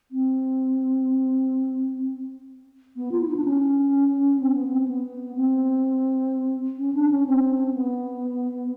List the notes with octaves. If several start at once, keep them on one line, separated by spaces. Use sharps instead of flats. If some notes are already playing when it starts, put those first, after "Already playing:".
C4
B3
F4
E4
D#4
D4
C#4
C4
B3
C4
B3
C4
C#4
D4
C#4
C4
B3